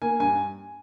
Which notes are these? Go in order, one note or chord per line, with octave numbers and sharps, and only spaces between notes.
A#3 G#5
G2 G#5